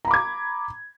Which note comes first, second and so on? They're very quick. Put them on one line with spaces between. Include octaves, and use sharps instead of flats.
A#5 B5 D6 G#6